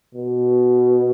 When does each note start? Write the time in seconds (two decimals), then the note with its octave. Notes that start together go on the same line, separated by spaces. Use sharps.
0.15 B2